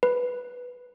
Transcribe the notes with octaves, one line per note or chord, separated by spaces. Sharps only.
B4